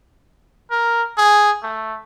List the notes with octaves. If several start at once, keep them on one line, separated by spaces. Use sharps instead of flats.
A#4
G#4
A3